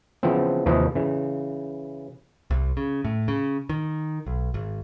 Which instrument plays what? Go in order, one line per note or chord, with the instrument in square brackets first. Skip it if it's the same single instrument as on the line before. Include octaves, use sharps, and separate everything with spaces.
[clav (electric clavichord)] C#3 E3 F3 B3 C4
D#2 C3 E3 F3 B4 D#5
C#3 E3
[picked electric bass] C2
C#3
A2
C#3
D#3
B1
G#1